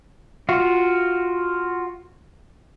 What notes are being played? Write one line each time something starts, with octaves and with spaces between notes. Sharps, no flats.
F4 F#4